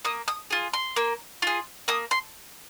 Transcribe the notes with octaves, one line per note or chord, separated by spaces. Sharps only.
A#3 D#6
D#6
F4 G#4
C6
A#3
F4 G#4
A#3 D#6
C6